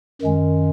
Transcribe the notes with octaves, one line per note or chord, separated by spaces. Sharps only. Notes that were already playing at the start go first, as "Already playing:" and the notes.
F#2 D#3 G#3 C#4